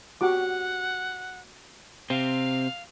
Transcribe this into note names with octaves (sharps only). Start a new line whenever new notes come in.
F#4 G4 F#5 D6
C3 C4 F5